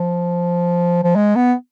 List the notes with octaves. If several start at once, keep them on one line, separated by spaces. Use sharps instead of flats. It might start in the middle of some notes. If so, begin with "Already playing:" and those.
Already playing: F3
F3
G#3
B3